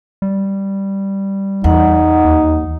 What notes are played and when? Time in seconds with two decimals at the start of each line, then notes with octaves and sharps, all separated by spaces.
0.22 G3
1.64 E2 D#4 F#5
2.24 D#2